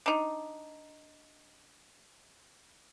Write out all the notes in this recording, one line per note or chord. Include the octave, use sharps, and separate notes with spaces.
D4 D#4